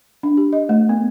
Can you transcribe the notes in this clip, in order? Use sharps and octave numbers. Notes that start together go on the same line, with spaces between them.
D4
G4
D#5
A3
B3